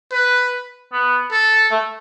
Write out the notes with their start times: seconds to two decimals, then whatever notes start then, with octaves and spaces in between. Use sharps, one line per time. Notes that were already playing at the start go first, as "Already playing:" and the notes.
0.12 B4
0.93 B3
1.32 A4
1.71 A3